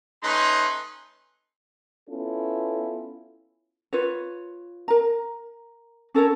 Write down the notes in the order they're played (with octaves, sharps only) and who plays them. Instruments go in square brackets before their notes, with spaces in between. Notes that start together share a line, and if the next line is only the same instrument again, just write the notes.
[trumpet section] A3 C#4 D#4 B4 C6
[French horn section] B3 C#4 E4 F4 A4
[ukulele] F4 B4 C#5
A#4 A#5
C#4 A4 A#4 C#5